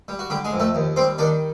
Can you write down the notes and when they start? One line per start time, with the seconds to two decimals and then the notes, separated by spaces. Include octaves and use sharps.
0.08 G3
0.19 F#4
0.30 D3 G3 G4
0.45 G#3 G#4
0.53 F2
0.59 A3 A4
0.75 D#2
0.96 G3 C4 C5
1.18 D#3 D4 D5